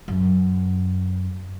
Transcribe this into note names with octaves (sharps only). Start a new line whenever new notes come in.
F#2